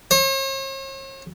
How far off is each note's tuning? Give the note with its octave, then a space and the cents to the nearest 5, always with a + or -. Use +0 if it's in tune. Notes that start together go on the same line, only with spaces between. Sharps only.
C#5 -45